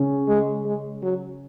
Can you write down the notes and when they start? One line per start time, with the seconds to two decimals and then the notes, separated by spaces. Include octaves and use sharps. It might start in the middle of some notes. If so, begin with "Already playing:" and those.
Already playing: C#3 C#4
0.28 G#3
0.65 G#3
1.02 F#3